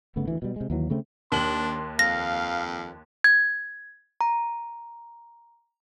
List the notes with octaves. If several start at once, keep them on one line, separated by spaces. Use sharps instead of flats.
G1 C#3 A3 B3
D2 E3
B2 G3
C3 G#3
D#2 E3 F#3
C#3 A3 C4
D#2 D4 C6 F#7
F2 F5 A#6
G#6
A#5